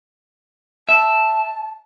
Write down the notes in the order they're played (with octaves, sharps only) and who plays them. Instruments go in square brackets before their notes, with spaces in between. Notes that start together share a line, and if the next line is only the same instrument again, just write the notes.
[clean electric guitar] E5 [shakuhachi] A5